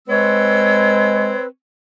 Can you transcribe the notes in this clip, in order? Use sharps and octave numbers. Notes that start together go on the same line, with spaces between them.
G#3 C4 B4 C#5 E6